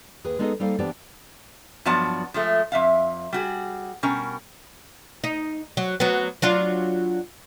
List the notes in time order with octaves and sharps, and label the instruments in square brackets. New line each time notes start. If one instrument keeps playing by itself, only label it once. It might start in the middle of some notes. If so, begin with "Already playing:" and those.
[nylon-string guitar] D#2 G#4 B4
G#3 B3 D#4 G#4 A4 D#5
G3 A#3 D#4 A4 C5 F5
E3 B3 D4 G4 C5 D5
[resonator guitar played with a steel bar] G2 F3 F#3 B3 D5 A5
F3 G#3 A3
F2 E5 F5
G3 F#4 G#4
B2 G3 C#4 A#4
[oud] D#4
F#3
F#3 B3
F#3 D4 F4